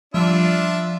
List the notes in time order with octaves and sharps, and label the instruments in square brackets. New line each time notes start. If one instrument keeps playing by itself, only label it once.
[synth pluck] F3 G3 [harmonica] D4 F4 E5